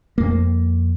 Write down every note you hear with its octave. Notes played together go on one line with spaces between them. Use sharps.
F2 A#3